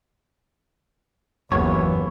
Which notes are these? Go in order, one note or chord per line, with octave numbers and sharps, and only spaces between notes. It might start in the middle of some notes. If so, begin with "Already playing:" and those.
F#1 D#2 E3 B3 C#5